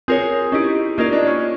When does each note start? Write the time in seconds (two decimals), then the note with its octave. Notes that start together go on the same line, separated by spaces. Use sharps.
0.08 C4 F4 G#4 A#4 C#5
0.52 C#4 D#4 E4 G4
0.98 A#3 C#4 D#4 F4 A#4 D5
1.12 D4
1.27 C#4